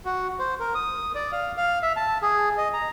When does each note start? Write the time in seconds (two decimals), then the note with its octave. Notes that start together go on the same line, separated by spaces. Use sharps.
0.05 F#4
0.39 C5
0.60 A#4
0.75 D#6
1.15 D5
1.32 F5
1.57 F5
1.83 E5
1.96 A5
2.22 G#4
2.57 D#5
2.73 A#5